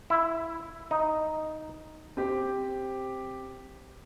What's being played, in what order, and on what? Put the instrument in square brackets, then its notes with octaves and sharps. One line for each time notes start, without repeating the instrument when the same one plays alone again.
[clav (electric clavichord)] E4
D#4
[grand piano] C4 G4